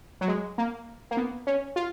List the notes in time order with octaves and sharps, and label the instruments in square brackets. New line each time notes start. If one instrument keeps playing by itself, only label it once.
[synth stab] F#3
G#3
A#3
A#3
B3
C#4
F4